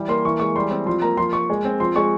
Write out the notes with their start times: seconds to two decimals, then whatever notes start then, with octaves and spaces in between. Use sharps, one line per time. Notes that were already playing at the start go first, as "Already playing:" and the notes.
Already playing: E3 G3
0.08 A#3 C6
0.25 E3 C#6
0.40 G#3 C#6
0.56 G3 C6
0.71 C4
0.86 F3 C6
1.02 A#3 A#5
1.17 F3 C6
1.33 A#3 C#6
1.50 G#3
1.65 C4
1.80 F3 C6
1.96 G#3 C#6